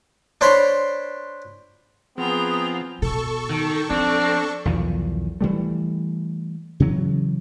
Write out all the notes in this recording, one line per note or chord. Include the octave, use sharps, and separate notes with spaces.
D4 C5 C#5 B5 C6
F3 B3 C4 G#4 G5 A#5
B2 A4 C#6
D#3
F3 C4 D4
B1 E2 D#3 F3
E3 F3 G3 A3
C#3 E3 F#3